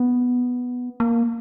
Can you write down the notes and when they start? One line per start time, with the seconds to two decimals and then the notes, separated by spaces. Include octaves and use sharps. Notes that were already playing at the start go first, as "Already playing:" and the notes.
Already playing: B3
1.00 A#3